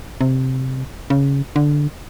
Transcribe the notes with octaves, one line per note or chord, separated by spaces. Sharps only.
C3
C#3
D3